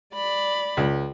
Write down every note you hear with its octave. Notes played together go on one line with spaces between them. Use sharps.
D5 B5
C#2